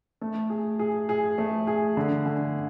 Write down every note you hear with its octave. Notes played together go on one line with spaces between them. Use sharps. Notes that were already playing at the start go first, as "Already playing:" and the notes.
A3
G#4
G#4
G#4
A3
G#4
D3
D3